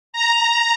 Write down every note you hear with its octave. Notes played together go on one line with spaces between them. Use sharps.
A#5